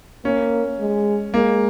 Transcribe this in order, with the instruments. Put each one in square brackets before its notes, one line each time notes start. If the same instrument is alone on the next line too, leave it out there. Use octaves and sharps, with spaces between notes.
[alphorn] A#3 [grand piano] C#4
[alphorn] G#3
[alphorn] G#3 [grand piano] A#3